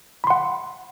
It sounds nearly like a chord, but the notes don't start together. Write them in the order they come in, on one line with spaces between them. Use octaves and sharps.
B5 C6 F#5